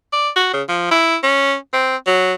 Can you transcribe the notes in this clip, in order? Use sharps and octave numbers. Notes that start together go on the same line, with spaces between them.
D5
F#4
C#3
F3
E4
C#4
C4
F#3